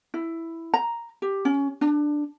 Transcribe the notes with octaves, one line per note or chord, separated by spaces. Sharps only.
E4
A#5
G4
C#4
D4